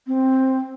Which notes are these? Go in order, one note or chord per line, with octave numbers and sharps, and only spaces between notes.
C4